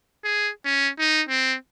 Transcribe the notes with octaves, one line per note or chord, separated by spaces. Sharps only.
G#4
C#4
D#4
C4